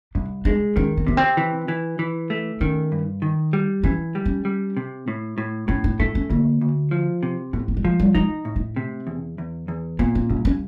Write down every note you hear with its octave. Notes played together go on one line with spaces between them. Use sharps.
C2 D4
G#3 D4
D#3 C#4
C4
C3 B3
C4
E3
E3
E3
A3
D#3 C#4
G2
D#3
G3
E3 C#4
G3
C#4
G3
C3
A2
A2
A2 C#4
D4
A3 D4
C#4
D2 A#3
D2
F3
C3
A2 B3
A#3
G3
F3 G#3
G3
G#3 D#4
A2
A3
C3
E2
E2
E2
A#2 B3
C4
C2 C#4
C#4